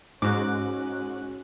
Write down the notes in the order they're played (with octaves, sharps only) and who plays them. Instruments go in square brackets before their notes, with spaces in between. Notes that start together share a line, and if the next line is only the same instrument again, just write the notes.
[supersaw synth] G#2 [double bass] C#4 [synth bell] F#4 F#6 [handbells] D6